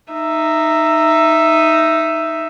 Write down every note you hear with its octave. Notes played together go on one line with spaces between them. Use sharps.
D#4 E5